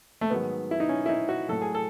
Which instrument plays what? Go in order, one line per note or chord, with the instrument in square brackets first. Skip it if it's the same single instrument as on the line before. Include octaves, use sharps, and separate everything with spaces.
[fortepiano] A3
G#2 D#3 F#3 B3
E4
D#4
C#4
E4
D#4
F#4
A2 F#3 A4
G#4
A4